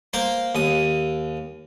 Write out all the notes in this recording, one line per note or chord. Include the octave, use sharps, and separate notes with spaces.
A#3 C5 C6
D#2 D#6